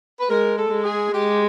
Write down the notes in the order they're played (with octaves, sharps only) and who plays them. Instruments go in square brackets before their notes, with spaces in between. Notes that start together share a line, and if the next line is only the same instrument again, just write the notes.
[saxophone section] B4
[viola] G#3 [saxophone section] A#4
[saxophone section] A4
[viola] G#3
[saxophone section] G#4
[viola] G#3 [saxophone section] G4